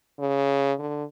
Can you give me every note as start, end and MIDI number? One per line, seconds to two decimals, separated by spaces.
0.19 0.73 49
0.79 1.04 50